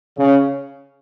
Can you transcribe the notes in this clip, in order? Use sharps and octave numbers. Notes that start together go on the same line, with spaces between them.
C#3